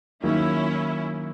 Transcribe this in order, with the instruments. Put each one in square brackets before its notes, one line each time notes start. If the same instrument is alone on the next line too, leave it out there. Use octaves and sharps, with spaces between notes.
[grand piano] D#3 F#3 A#3 [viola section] C#4 E4